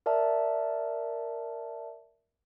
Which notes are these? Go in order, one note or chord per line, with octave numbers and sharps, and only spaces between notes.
A#4 D5 E5 A5